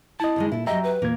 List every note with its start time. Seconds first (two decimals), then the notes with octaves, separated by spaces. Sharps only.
0.20 E4 D#5 A5
0.36 D3 D#3 G#3
0.52 A#2 E4 A4
0.67 F#3 G4 D#5 E5 G5 A#5
0.84 B4
1.02 E2 A#2 A#3 G#6